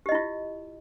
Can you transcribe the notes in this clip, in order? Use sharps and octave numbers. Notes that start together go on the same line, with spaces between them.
E4 F4 G4 D#5